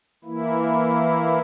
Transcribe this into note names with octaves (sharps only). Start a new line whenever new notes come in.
E3 A#3 E4